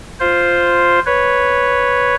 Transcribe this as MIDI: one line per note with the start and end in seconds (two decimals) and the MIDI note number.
0.20 1.00 65
0.20 1.00 72
1.06 2.15 71
1.06 2.15 73